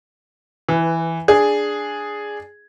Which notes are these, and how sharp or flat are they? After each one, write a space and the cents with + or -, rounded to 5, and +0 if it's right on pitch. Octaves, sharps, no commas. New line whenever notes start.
E3 +0 B4 +20
D4 +0 G#4 +0